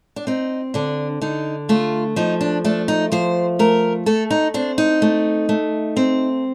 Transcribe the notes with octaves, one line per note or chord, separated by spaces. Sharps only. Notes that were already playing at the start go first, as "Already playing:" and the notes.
D4
C4 D#4
D3 D4
D3 D#4
A3 F4
F3 D#4
D4
A3 D4
D#4
F3 C5
A3 A#4
A3 A4
D#4
C4 D4
D#4
A3
A3
C4